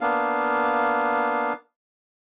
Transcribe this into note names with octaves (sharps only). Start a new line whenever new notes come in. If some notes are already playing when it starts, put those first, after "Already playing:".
A#3 B3 D4 F5